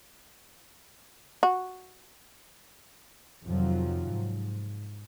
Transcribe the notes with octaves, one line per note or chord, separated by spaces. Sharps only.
F#4
F2 C3 D#3 F3 F#3
G#2